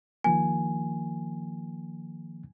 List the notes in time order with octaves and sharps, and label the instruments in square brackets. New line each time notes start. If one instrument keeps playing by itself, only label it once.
[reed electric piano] D#3 F3 A#3 [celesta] G#5